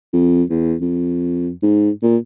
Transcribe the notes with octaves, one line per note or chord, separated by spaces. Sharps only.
F2
E2
F2
G#2
A#2